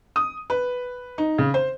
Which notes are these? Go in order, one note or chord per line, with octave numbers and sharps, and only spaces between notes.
D#6
B4
D#4
C#3
C5